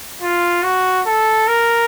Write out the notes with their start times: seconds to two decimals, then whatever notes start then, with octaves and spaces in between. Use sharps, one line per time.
0.22 F4
0.63 F#4
1.06 A4
1.48 A#4